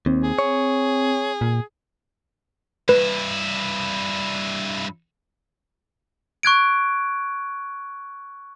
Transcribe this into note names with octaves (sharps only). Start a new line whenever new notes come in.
D#2 C4
G#4
C#5
A#2
G2 E4 B4
C#6 F#6 G#6 D7